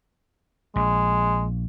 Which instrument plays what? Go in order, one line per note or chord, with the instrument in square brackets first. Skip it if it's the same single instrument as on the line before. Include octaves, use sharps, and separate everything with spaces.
[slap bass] A#1 [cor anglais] G#3